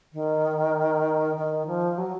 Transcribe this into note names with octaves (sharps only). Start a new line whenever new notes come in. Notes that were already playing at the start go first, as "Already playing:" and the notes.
D#3
D#3
F3
F#3